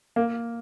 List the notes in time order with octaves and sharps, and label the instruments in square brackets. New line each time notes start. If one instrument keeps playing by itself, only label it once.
[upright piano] A#3